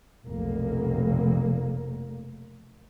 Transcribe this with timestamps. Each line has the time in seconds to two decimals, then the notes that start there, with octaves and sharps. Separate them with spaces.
0.24 F1 B1 A#3